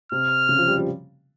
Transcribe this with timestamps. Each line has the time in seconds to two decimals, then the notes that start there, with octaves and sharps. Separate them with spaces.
0.12 C3 F6
0.49 C#3
0.58 F3
0.68 G3
0.77 F3